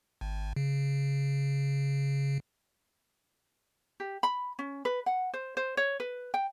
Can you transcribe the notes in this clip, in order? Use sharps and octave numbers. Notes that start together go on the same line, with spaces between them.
G#1
C#3
G4
B5
C#4
B4
F#5
C5
C5
C#5
B4
G5